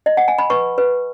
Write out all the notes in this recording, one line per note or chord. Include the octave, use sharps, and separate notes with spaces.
D#5
F#5
G#5
B5
B4 C#6
B4